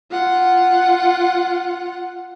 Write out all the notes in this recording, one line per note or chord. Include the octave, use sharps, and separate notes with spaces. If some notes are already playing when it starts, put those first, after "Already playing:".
F4 F#5